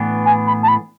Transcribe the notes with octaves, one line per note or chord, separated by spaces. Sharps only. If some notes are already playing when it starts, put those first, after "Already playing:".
Already playing: A2 E3 B3 D4
G#5
B5
A5
B5